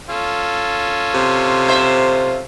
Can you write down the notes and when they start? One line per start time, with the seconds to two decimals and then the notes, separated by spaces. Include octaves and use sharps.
0.09 C#4 F4 A4
1.14 C3
1.68 C5 E5